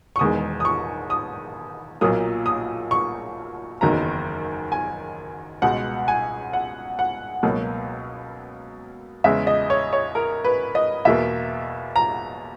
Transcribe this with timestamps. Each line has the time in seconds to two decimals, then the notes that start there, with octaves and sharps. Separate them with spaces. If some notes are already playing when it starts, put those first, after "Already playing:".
0.16 C#6
0.19 E1 E2 D#3 G#3 D#6
0.60 D#6
0.65 C#6
1.10 D#6
2.01 B1 A#2 F#3 A#3 D#6
2.46 D#6
2.91 C#6
3.81 F#1 E2 D#3 F#3 A#5
4.72 G#5
5.62 C#2 B2 G#3 F#5
6.08 G#5
6.53 F#5
6.99 F#5
7.43 C#2 B2 F#3 A#3
9.24 E2 C#3 G#3 E5
9.47 D#5
9.70 C#5
9.93 C#5
10.15 A#4
10.44 B4
10.75 D#5
11.05 E2 B2 A#3 E5
11.96 A#5